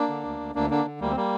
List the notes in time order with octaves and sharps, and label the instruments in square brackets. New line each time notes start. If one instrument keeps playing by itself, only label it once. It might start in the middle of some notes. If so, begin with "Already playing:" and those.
Already playing: [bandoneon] A#3 D4
D3
D2
D2
D2 A#3 D4
D3 A#3 D4
D3
D2 G3 A#3
C4
G3 A#3